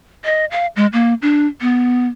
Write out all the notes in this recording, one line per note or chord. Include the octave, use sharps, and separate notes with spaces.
D#5
F5
G#3
A#3
D4
B3